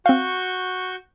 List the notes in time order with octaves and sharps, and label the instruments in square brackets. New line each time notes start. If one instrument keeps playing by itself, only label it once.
[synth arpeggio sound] C4 F5 [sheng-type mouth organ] F#4 C#6 G6